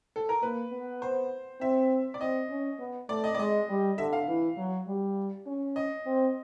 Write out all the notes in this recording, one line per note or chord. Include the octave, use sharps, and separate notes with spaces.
A4
A#4
A#3 B4
B3
C5
C4 E5
D5
C4 D#5
C#4
B3
A3 D5
D#5
D5
G#3 D#5
G3
D3 E5
F5
E3
F#3
G3
C#4
D#5
C4